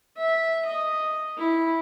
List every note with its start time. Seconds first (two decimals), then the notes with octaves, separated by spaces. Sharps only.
0.18 E5
0.66 D#5
1.38 E4